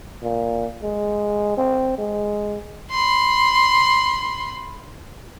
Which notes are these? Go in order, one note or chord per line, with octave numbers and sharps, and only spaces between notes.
A#2
G#3
C4
G#3
B5 C6